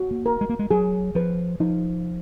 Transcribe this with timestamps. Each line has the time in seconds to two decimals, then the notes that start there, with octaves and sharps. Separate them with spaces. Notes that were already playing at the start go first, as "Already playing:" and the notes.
Already playing: F#4
0.11 A#3
0.26 A#4
0.41 G#3
0.49 A#3
0.59 G#3
0.71 F#3 G#4
1.15 F3 B4
1.60 F3 D#4